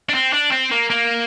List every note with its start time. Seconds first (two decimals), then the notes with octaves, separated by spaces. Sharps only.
0.09 D4
0.14 C4
0.33 D4
0.52 C4
0.71 A#3
0.90 A#3